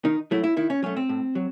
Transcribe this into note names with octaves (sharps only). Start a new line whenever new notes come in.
D#3 D#4
F#3 A3 E4
E4
D#3 E4
C#4
F#3 A3 C#4
C4
A2
F#3